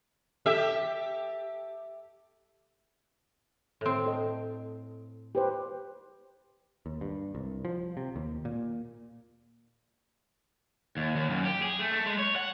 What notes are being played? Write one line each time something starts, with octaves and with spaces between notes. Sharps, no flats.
G4 A4 E5
A2 C4
A4 D#5
G4 B4 C5
D#2
G2
C2
F3
C3
D#2
A#2
D#2
D#2
F#2
G4
G#4
A3
A3
G#3
C#5
F#5